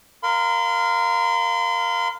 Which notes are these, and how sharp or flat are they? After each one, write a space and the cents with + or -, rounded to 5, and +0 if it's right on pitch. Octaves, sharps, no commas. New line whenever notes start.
A#4 +0 F5 +0 C6 -40